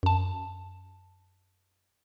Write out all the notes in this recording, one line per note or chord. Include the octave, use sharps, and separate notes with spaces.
F#2 A5